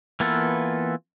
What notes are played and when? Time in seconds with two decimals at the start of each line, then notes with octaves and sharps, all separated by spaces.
0.20 E3 A#3 B3 F4 A4